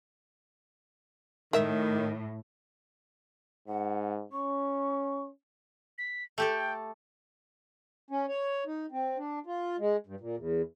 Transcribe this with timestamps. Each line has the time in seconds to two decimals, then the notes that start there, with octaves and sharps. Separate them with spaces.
1.53 A2 D#3 A#4 E5
3.68 G#2 F#5
4.32 C#4 C#6
5.98 B6
6.38 A3 G4 A4 G5
8.11 C#4
8.28 C#5
8.66 D#4
8.92 C4
9.17 D4
9.46 F4
9.79 G#3
10.07 G2
10.20 A#2
10.37 E2